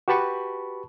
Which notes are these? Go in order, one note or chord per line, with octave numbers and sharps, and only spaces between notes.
F#4 G4 B4 A5 B5 C#6